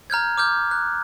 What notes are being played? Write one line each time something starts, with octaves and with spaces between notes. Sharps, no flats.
A#5 F6 G6 G#6
D6 F6 G6
F#6